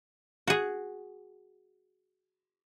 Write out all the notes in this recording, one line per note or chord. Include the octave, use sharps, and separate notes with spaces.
F#4 G#4